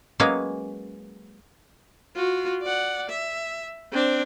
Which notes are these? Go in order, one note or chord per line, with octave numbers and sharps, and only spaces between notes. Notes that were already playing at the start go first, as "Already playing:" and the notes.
F#3 G#3 A#3 B3 C#4 F5
F4 F#4
D5 F#5
E5
C4 D4